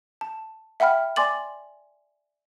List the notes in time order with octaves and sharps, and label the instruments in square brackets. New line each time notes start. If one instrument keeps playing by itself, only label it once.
[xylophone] A5
E5 F#5 G5 B5 F6
D5 G#5 C6 D6 A6 F#7